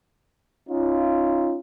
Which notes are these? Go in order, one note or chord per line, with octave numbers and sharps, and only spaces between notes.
C#4 D#4 F4